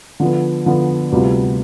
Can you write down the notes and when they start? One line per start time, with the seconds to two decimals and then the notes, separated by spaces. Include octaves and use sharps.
0.20 D3 F3 B3
0.66 D3 F3 B3
1.12 D2 C3 G3 B3 F4